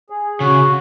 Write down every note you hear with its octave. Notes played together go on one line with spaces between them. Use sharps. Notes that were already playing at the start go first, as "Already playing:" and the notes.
G#4
C#3 F#4